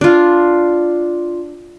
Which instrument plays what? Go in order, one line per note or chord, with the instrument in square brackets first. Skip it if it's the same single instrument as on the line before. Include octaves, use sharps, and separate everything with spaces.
[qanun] D4 F4